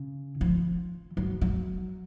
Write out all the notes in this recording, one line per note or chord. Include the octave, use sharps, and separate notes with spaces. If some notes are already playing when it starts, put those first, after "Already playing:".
Already playing: C#3
F3
F#3
F#3